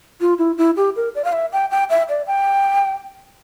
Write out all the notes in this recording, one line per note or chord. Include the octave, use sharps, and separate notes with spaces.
F4
E4
E4
G4
A#4
D5
F5
E5
G5
G5
E5
D5
G5